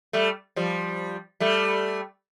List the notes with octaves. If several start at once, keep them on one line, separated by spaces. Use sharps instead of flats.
G3 A3
F3 G3
G3 A3